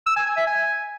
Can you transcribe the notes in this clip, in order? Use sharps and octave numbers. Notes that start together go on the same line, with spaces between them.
E6
G#5
G#5
E5
G#5